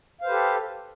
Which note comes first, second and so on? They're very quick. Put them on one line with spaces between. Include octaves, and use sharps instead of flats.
F5 C5 B4 G4 A4